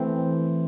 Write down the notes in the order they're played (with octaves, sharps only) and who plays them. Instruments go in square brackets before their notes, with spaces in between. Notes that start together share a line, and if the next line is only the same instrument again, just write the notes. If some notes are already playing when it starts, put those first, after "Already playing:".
Already playing: [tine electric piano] E3 A3 C4